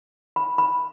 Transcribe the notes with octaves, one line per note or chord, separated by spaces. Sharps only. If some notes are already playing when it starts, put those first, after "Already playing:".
B5
B5